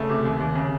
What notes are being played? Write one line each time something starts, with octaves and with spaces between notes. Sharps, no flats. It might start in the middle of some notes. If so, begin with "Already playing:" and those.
Already playing: C#3 A3
C3
D#2
D#2
C#3